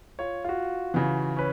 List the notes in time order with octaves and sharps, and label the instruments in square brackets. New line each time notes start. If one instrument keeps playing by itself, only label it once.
[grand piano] F4 C#5
F4 F#4
[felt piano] C#3 E3
[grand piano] C#4 B4